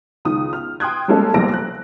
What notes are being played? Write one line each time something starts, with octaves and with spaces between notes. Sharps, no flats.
C#2 D#3 D#6
F6
G5 C6 D#6 F#6 G#6
G3 G#3 A#3 C#4 A4
F1 C2 F2 A#3 A#6 D7
F#6